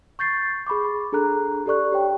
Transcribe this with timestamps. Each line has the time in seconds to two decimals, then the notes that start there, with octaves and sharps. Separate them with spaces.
0.19 C#6 G6 A6 C7
0.67 G#4 B5 C#6 D6
1.12 D4 G#4 A4 A#5 F#6
1.66 G4 A4 D5 C#6 F#6
1.92 G4 C#5 G5